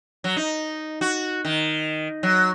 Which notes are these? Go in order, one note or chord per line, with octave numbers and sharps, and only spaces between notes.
F#3
D#4
F#4
D#3
F#3